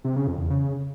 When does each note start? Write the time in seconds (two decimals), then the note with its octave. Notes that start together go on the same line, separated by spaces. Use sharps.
0.04 C3
0.16 C#3
0.27 F2
0.39 E2
0.50 C#3